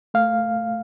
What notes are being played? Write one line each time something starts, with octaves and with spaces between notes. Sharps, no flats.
A3 F5